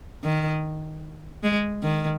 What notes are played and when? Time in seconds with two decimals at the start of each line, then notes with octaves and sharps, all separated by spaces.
0.24 D#3
1.43 G#3
1.83 D#3